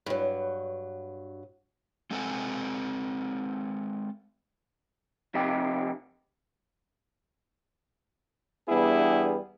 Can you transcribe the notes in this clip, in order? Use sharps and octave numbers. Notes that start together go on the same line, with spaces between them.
G2 F#3
G#3 C4 A4 F#5 G#5
F2 C3 D#4 G4
E2 G3 B3 D4 E4 G#4